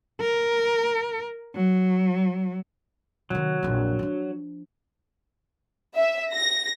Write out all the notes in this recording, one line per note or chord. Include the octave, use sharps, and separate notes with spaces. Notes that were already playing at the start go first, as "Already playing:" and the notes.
A#4
F#3
C3 D#3 F#3
A#1 F2
F3 D4
E5
A#6